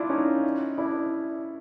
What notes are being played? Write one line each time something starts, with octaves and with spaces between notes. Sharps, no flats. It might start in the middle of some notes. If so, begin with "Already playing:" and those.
Already playing: D4 E4 F4
C#4 D#4
D4 E4